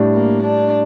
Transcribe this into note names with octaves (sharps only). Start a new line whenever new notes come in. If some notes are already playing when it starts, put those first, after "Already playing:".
Already playing: A2 G3 D4
A#3
D4